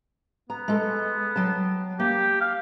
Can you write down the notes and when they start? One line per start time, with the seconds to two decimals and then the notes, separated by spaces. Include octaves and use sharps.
0.50 B3 A#5
0.68 G#3 A4
1.36 F#3 G5 A5
2.00 A#3 G4
2.41 F5